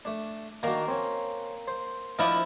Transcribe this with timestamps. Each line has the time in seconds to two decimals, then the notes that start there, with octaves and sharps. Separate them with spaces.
0.05 A3 D4
0.63 D#3 A#3 D4 F#4
0.88 C4 C#4
1.68 C5
2.19 F3 E4 D5 D#5